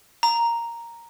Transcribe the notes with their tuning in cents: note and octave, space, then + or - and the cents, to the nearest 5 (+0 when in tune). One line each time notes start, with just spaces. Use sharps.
A#5 +0